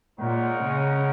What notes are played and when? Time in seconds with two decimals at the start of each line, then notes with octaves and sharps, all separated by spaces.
0.20 A#2 G#3 D#4 A#4 C#5 F#5
0.63 C#3